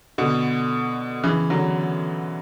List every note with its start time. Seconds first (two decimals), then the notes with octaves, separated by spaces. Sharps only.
0.18 B2 D3
1.24 C#3 E3
1.50 D3 F#3